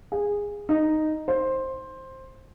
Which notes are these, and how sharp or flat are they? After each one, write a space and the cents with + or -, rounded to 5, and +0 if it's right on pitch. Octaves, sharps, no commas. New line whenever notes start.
G#4 -15
D#4 -5
C5 +10